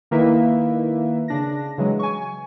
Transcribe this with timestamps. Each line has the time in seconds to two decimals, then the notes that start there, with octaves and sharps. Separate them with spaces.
0.11 D#3 A#3 D#4 E4 B4 E5
1.28 C#3 D4 A#6
1.78 C#3 E3 F#3 G#3
1.99 G#5 C#6